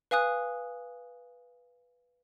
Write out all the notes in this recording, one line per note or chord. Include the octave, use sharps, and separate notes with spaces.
B4 F5 G#5 D#6 F#6